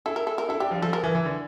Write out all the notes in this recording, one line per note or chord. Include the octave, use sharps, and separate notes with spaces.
E4 A4
A#4
A4
A#4
E4 A4
D4 G4
F3
F3 A4
A#4
E3
E3
D3